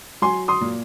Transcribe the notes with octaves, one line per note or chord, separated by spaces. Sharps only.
F#3 G#5 C6
C6 D#6
A#2